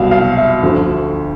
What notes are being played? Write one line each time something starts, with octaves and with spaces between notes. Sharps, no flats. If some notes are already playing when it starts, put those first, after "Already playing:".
Already playing: C2 B2 F#3 F5
F5
E5
D2 D3 F3 A3